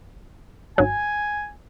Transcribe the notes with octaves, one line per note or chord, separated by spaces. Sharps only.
G#1 F#3 G#5